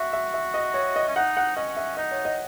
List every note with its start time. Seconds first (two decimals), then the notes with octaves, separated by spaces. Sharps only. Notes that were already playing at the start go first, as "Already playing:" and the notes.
Already playing: F#4 E5
0.13 E5
0.34 E5
0.54 D#5
0.74 C#5
0.96 D#5
1.08 C#4
1.16 D#4 F#5
1.37 F#5
1.57 C#4 D#5
1.77 E5
1.97 D#4 D#5
2.12 C#5
2.25 D#5